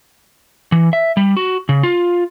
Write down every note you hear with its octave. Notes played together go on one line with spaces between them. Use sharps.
E3
E5
G3
F#4
C#3
F4